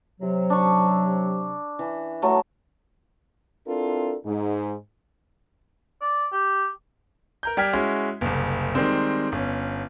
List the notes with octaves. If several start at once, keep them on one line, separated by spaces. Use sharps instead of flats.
C3 F#3
D4 C#6
E3
F#3 A3
C4 D4 E4 F4 A4 A#4
G#2
D5
G4
A#4 A#5 G6
G3 G5 F6 G#6 B6
G#3 C#4 E4 F#4
F#1 C2
D#3 G3 G#3 C4
G1 C#4